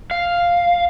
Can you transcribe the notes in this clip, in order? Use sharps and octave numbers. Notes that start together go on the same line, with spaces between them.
F5